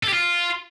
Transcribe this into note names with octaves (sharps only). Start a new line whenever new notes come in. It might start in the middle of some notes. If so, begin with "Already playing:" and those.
A4
G4
F4